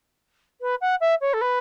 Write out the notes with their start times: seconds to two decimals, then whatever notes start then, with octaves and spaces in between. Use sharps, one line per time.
0.61 B4
0.81 F#5
1.01 E5
1.21 C#5
1.33 A4
1.41 B4